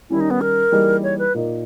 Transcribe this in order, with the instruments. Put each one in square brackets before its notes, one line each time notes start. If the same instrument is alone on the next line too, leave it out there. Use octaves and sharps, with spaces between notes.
[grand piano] D#3 G3 C#4 [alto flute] E4
[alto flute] D#4
B3
A#4
[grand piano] E3 G3 A#3 D#4 G#4
[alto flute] C#5
B4
[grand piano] A#2 A#3 D#4